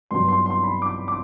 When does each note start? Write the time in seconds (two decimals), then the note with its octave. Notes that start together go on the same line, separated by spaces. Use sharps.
0.11 G2 F#3 B3 C6
0.28 C6
0.46 C6
0.63 B5
0.82 D6
1.08 D6